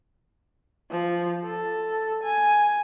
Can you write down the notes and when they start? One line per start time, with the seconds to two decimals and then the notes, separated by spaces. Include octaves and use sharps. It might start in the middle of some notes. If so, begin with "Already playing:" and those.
0.91 F3
1.45 A4
2.23 G#5